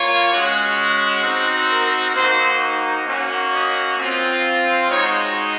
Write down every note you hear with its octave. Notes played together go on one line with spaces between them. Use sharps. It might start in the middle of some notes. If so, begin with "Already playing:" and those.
Already playing: A#3 F4 C#5
G#3 C#4 F#4
C4 D#4 F#4
A#4
A#3 D#4 F#4 C5
A#3 C#4 F#4
D#5
C4 F4
G#3 D#4 F#4 C#5